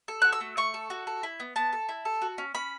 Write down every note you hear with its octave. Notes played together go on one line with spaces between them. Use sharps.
A4
F#4 F#6
E6
A3
A3 C#6
A4
F#4
A4
E4
B3
B3 A5
A4
E4
A4
F#4
C#4
C#4 B5